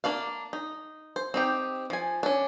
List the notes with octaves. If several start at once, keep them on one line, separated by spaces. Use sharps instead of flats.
A#3 D4 D5 F5
D#4
C5
C4 D#4 G4
F3 G#5
C#4 D4